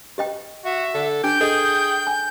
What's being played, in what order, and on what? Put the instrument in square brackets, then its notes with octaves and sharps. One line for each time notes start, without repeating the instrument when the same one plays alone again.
[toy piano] G4 D#5 G5
[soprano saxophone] F#4 [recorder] E5
[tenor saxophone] D3 [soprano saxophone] A4
[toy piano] D4 [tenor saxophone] G4 [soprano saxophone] G5 [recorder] G6
[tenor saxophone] G#4 [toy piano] A4 D#5
[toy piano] G#5